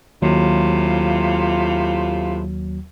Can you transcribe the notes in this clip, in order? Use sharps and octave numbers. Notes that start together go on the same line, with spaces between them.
D#2 A2 C3 F#3 F4